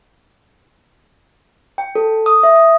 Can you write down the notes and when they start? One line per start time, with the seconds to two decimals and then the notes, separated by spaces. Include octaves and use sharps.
1.78 G5
1.95 A4
2.26 D#6
2.43 E5
2.56 D#6